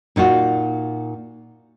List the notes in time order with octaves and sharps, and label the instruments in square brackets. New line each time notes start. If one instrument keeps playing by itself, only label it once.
[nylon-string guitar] A#2 D#4 F4 F#4